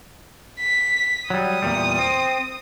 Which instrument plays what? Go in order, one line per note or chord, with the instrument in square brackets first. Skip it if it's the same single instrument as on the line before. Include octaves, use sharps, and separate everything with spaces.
[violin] B6
[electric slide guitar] F#3 G3 [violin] D#6
[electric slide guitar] E2 A#2 G3
C4